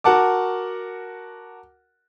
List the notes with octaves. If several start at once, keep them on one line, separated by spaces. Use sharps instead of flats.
F#4 A#4 F#5 A5 D6